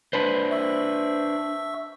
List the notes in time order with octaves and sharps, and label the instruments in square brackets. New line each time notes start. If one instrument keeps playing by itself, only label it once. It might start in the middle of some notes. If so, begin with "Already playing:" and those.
[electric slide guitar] D4 B4 C5
[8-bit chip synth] E5 C#6 E6